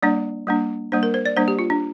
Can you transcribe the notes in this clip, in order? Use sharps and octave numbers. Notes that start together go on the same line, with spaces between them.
G3 A#3 D4 D5
G3 A#3 D4
G3 A#3 D4 C5
A#4
C5
D5
G3 A#3 D4 C5
G4
F4
D4